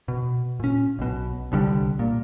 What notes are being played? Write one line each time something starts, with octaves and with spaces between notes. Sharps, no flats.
B2
A#2 C#4
B1 B2
C2 D3 F3 G3
A#2